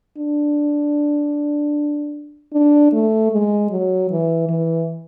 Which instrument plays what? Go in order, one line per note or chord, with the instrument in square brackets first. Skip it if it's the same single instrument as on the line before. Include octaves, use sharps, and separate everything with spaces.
[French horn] D4
D4
A3
G#3
F#3
E3
E3